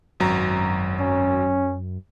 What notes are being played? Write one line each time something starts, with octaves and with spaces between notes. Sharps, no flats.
G#1 F#2 F#3 A#5
C#4